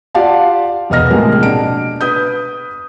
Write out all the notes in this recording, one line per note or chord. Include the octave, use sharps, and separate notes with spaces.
F4 G4 D5 F5 F#5 A5
E1 B3 D#5 F6 A#6
A2 C3 F3 G#3 A#3
B2 D4 D7
B4 D#6 G6